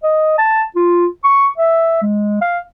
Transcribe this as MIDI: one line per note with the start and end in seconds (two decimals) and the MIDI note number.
0.03 0.35 75
0.38 0.65 81
0.76 1.07 65
1.24 1.48 85
1.58 1.97 76
2.02 2.37 56
2.42 2.60 77